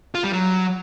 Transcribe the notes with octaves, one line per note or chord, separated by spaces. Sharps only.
F4
G3
F#3